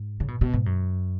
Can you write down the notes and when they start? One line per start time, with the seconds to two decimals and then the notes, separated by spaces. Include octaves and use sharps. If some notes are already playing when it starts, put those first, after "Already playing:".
Already playing: G#2
0.20 C#3
0.28 B2
0.41 B2
0.54 G#2
0.66 F#2